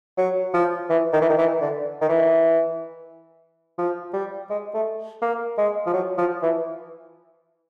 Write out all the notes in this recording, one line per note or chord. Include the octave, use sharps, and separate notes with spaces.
F#3
F3
E3
D#3
E3
D#3
E3
D3
D#3
E3
F3
G3
G#3
A3
A#3
G#3
F3
F#3
F3
E3